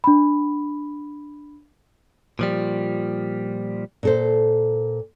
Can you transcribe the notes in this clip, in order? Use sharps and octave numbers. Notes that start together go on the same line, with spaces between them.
D4 B5
A#2 F3 G3
A#2 A4 C5